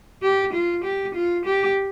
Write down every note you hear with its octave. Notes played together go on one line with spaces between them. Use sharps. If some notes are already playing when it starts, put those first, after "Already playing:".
G4
F4
G4
F4
G4